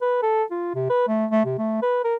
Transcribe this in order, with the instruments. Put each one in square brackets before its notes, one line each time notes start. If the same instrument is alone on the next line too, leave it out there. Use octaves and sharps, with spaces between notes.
[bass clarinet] B4
A4
F4
C3
B4
A3
A3
C3
A3
B4
A#4